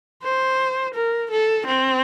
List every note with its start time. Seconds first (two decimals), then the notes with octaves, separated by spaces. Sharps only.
0.23 C5
0.94 A#4
1.31 A4
1.67 C4